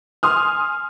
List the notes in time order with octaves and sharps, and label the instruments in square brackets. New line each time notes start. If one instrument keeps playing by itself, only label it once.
[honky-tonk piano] G#5 C6 D#6 F6